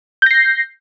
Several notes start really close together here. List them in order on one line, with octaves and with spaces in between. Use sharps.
G6 A#6 C7